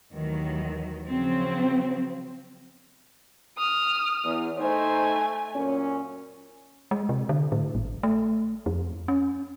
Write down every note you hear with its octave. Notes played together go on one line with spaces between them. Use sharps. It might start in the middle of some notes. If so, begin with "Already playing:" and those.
D#2 D#3 E3 F#3 A3
C#3 F3 F#3 C4
D#6 F6
E2
A3 D#4 C5 G#5
F#2 A#2 C#4
G#3
C3
D3
A2
G#1
A3
F2
C#4